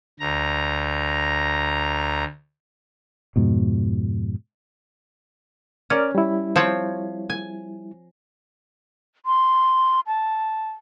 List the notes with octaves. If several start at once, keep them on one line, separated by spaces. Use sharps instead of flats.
D2 A#5
F2 G#2 B2
C#4 A#4 D5 F6
G3 E4
F3 C4 C#5
G#5
C6
A5